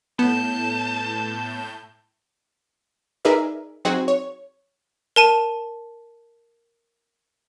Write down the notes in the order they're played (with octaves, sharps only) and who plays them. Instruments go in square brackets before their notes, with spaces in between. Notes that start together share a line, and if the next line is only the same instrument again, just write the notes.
[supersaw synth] A2 G6 [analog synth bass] B3 [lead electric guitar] A5
[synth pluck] D#4 G#4 A#4 B4 D5 E5
F#3 C4 D#4 F#4 G#4
C#5
[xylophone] A#4 A5 D#7